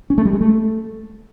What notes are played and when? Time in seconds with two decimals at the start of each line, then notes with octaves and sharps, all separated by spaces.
0.10 C#4
0.18 A3
0.25 G3
0.33 G#3
0.41 A3